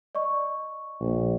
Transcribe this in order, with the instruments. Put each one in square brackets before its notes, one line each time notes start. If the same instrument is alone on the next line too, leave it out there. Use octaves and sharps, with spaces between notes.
[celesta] D5 D#5 C#6
[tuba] A#1